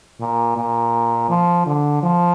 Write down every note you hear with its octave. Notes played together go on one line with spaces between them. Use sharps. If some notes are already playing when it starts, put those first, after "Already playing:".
A#2
A#2
F3
D3
F3